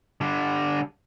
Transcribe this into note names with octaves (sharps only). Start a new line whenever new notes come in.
D3 G3